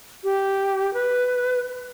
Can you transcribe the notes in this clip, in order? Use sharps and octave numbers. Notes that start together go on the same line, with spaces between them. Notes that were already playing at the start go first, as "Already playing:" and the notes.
G4
B4